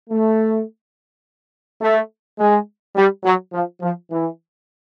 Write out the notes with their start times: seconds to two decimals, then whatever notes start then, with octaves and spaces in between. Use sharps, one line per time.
0.10 A3
1.81 A3
2.39 G#3
2.96 G3
3.24 F#3
3.53 F3
3.81 F3
4.10 E3